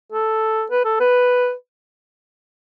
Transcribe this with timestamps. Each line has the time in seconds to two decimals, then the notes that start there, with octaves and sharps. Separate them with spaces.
0.12 A4
0.71 B4
0.85 A4
1.00 B4